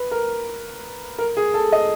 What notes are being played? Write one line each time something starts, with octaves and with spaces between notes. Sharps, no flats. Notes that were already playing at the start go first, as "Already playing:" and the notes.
Already playing: B4
A#4
A#4
G#4
A4
D#5